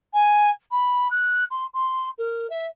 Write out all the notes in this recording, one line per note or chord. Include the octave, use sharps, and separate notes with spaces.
G#5
B5
F#6
C6
C6
A#4
E5